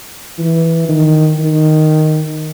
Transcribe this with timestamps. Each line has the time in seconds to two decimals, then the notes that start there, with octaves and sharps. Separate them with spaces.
0.39 E3
0.89 D#3
1.39 D#3